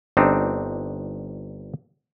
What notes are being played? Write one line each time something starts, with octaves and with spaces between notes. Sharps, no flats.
G1 C4 D4 D#4